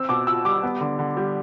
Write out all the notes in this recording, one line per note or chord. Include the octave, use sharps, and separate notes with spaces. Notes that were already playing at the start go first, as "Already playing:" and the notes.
Already playing: C4 E6
B2 D6
F4 E6
G3 D6
B3
D3
D3
G3